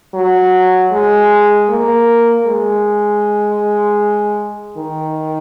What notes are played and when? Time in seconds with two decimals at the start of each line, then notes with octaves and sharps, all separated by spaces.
0.14 F#3
0.92 G#3
1.69 A#3
2.46 G#3
4.78 D#3